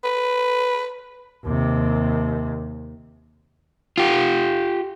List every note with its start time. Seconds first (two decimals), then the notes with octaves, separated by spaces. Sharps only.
0.04 B4
1.45 D#2 C3
3.98 F4 G4